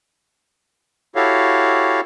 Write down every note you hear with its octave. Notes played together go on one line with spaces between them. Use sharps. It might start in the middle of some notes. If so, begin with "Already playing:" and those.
E4 F#4 G4 A4 C#5 F5